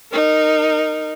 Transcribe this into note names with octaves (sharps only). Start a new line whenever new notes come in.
D#4 A#4